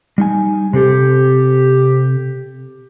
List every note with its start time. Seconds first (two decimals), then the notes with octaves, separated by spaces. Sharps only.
0.18 G3 D#4 G#5
0.73 C3 C4 G4 A4